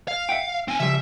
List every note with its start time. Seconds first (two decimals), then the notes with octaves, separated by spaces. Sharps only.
0.08 F5
0.29 E5 F#5 G5
0.68 C4 G#5
0.80 C#3 F3 G3 E5